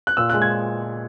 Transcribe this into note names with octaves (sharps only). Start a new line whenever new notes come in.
F#6
A#2 E6
G#3 F#6
G#6